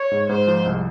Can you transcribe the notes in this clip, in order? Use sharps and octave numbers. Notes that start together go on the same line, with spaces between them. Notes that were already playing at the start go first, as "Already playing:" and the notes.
Already playing: C#5
G#2
G#2 C5
F3
C2